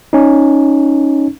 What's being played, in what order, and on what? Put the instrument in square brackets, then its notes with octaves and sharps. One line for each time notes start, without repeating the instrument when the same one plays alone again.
[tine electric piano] C#4 D#4